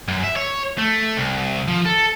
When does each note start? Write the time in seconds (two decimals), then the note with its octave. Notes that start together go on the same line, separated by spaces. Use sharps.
0.08 F#2
0.24 E5
0.37 C#5
0.79 A3
1.17 C2
1.68 F3
1.85 A4